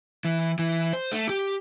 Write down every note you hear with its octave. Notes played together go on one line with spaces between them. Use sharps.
E3
E3
C5
A3
G4